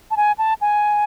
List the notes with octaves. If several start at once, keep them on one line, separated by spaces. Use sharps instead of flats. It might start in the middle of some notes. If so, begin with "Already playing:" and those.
A5
G#5
A5
G#5